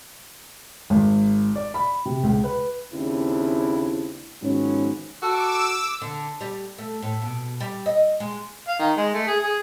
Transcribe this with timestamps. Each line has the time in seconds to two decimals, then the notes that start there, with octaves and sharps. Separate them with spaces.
0.90 G#1
1.56 D5
1.74 B5
2.05 C3
2.23 C#2
2.44 B4
2.94 D#2 C#3 C4 D4 E4
4.42 G#2 D#3 F3 F#3 B3 C#4
5.22 F#4 A4 D6 E6
6.01 D3
6.41 G3
6.78 A3
7.02 A2
7.22 B2
7.60 G3
7.86 D#5
8.20 G#3
8.68 F5
8.79 D#3
8.97 G#3
9.14 A3
9.27 G#4
9.42 G#4